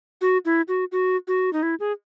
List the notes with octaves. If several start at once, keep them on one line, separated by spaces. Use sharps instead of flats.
F#4
E4
F#4
F#4
F#4
D#4
E4
G#4